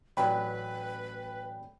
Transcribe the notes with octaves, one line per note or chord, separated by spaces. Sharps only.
A1 F#3 B4 D5 G5 B5